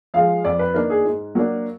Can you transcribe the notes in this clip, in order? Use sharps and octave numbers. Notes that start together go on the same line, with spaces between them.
F3 G#3 F5
F2 D5
B4
D#3 A#3 D4 A#4
G#4
G#2
F#3 A#3 D4